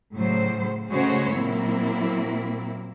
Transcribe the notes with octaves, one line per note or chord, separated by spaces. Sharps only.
A2 C#3 F#3 C5
C#3 G#3 A3 F#4 C5 C#5
A#2 F#3 A#3 C4 E4